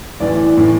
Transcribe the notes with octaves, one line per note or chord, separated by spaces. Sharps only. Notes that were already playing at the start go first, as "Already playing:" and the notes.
A1 A2 E3 D5
A2 E3